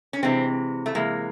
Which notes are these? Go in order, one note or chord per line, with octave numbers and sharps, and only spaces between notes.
C#4
C3 E3 G#3 C4
A3
C3 E3 G#3 A#3